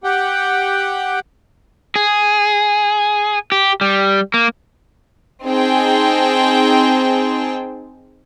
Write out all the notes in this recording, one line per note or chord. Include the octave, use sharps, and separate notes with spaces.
G4 F#5 G5
G#4
G4
G3
A#3
C4 D#4 G#4 C5 G5 A5